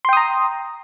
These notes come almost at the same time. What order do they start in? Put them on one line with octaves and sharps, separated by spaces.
C6 G5 D#6 A#5